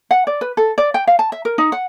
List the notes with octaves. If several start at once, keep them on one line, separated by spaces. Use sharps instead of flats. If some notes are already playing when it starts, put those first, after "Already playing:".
F#5
D5
B4
A4
D5
G5
F5
A5
E5
A#4
D#4
F#5